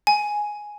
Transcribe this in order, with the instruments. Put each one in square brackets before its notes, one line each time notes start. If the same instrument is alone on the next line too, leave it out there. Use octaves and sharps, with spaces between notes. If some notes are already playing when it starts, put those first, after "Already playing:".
[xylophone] G#5